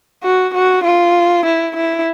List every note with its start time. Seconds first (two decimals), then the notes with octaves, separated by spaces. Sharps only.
0.24 F#4
0.54 F#4
0.84 F4
1.46 E4
1.76 E4